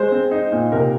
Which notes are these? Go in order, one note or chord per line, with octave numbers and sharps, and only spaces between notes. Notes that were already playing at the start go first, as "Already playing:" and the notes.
Already playing: G#3 C5
C4
D#4
A#2
C3 A#4